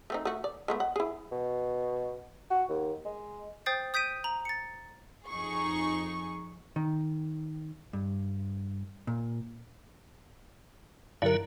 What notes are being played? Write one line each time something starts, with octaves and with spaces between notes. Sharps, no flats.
A3 C4 D#4
A3 F#4
D5
G#3 A3 B3
F#5
E4 G#4
B2
F#4
D#2
G#3
C5 G5 D#6 G6 A6 C7
D#6 G6 B6 D7 D#7
A#5 F7 F#7
A6 C#7
F2 D#4 G#4 C#6
D#3
G2
A#2
G2 D3 F#3 E4 A#4